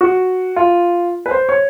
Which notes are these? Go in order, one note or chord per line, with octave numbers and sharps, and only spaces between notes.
F#4
F4
B4
C5
C#5